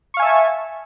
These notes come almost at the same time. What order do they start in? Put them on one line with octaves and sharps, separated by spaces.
C#6 F5 G#5 E5 A5